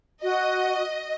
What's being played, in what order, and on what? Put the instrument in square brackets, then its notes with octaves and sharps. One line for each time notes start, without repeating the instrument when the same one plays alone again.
[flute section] F#4 [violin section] D#5